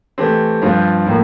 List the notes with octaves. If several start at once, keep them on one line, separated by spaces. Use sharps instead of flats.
E3 A3 C4 G4
G2 F3 C4 F4
A2 F3 A#3